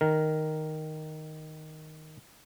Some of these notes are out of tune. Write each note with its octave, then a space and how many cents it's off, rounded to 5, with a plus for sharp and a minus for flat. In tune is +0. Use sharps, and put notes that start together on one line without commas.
D#3 +0 A#4 +0